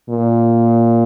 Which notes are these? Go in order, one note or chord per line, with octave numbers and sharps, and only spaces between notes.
A#2